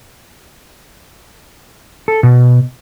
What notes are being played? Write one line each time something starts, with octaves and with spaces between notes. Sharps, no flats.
A4
B2